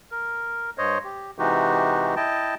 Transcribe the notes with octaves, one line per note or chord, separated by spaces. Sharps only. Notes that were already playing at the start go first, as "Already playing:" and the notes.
A#4
G2 C5 C#5 D#5
G4
C3 E3 G#3 D#4 F#4 G4
E4 D#5 G5 A5